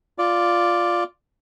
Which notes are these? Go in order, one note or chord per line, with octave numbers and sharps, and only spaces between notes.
F4 D5